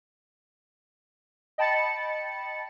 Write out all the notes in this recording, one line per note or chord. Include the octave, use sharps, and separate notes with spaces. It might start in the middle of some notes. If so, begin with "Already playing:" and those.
D#5 G5 A5 B5 A6 C#7